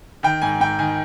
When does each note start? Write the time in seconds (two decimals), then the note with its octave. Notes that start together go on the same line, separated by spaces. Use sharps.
0.23 D#3 G5
0.42 G#2 G#5
0.60 G#2 G5
0.79 D#3 G#5